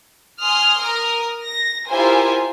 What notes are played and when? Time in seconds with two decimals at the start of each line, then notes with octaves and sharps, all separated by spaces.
0.40 G#5 C6 D#6 F6
0.80 A#4 D#6 F6
1.42 A#6
1.88 E4 F4 G4 A#4 C5 G#5